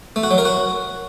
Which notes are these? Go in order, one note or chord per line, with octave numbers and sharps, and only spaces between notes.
A3
F#4
F#3
A#4
F#4